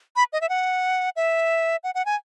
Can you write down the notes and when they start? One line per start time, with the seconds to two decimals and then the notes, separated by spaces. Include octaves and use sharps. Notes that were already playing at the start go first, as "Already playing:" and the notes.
0.16 B5
0.33 D#5
0.41 E5
0.49 F#5
1.16 E5
1.84 F#5
1.95 F#5
2.06 G#5